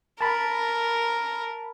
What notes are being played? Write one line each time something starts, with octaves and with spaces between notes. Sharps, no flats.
A#4 A5 B5